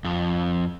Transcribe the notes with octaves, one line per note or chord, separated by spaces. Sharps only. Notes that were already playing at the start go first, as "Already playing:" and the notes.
F2